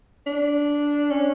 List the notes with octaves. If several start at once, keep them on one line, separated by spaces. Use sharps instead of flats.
D4
C#4